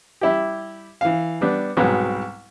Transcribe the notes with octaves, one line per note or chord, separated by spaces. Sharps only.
G3 E4 G4
E3 F5
G3 B3 D4
C2 G#2 B2 F#3 G#3 B3